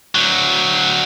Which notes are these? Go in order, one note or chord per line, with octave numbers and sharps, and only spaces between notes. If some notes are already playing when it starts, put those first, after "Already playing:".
D2 F#3